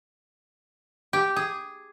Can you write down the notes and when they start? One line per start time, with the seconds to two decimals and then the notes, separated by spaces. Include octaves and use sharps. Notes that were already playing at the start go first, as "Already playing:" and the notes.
1.13 G4
1.36 G#4